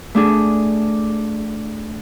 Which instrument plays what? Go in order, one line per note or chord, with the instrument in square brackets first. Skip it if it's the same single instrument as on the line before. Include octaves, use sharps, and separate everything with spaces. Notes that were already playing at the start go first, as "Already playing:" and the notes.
[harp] A3 D4 G#4